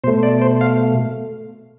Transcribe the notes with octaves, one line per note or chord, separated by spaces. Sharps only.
B2 A3 C5
D5
C5
F5